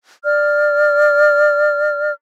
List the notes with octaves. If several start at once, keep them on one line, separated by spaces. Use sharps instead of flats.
D5 F6